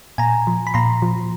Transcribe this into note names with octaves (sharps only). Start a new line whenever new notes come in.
A#2 G#5 A#5
F3
B5
A#2 A#5 C6
F3